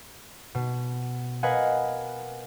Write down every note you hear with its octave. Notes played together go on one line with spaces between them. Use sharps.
B2
A#4 B4 D#5 F5 F#5 G#5